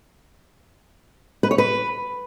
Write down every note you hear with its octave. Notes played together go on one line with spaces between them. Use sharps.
B4
C#5
B4